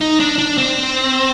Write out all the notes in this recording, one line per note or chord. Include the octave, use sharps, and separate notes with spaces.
D#4
D4
D4
C4